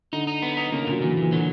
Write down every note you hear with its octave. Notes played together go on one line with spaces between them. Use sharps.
D3 D#4
D#4
B3
D#4
C#3 A#3
D3
A#2 F#3
A#2 E3
A#2
E3
D3 F#3